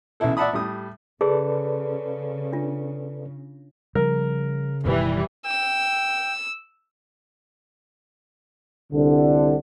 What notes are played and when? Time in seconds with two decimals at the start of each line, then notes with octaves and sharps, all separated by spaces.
0.20 B1 C#3 E3 E4 A4
0.37 D5 E5 F#5 A5 B5 D#6
0.53 A2 G3 D#6
1.21 C#3 G#4 A4 B4 D5
2.52 D4 F4
3.95 C#3 F3 G3 A#4
4.85 F#1 B2 D#3 E3 G3
5.46 G5 E6
8.93 C2 D3